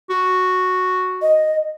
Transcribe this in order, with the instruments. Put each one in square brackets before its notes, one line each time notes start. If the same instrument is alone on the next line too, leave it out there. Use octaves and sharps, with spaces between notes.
[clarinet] F#4
[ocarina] D#5